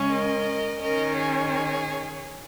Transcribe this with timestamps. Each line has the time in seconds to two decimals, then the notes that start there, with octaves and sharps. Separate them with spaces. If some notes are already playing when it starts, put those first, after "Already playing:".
Already playing: C#3 G#3 C#4
0.09 A#4 D#5
0.80 D#3 C#4 A#4 D#5
1.16 G#4 C#5